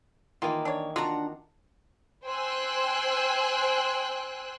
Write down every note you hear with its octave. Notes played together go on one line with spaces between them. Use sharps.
D#3 E3 A#3 F4
D4 C#5
D4 F4 F#4 F#5 A#5
C5 G5 G#5 E6 F#6